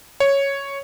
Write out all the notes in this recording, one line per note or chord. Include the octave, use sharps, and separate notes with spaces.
C#5